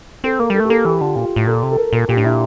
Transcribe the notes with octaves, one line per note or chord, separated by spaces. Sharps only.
C4 A4
A#3 A#4
G3 A4
A3 G4
A#3 A4
E3 G4
D3 F4
A#2 F4
A2
A#2 A4
C3
A4
A#4
A#2 A4
A#2 G4
A2 D4
A#2 E4